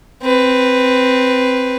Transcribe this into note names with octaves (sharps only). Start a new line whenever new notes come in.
C4 B4